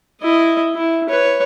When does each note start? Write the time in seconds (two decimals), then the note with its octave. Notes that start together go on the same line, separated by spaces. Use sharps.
0.22 E4 D#5
0.76 E4
1.09 B4 C#5